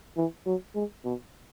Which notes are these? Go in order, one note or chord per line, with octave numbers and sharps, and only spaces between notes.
E3
F#3
G#3
B2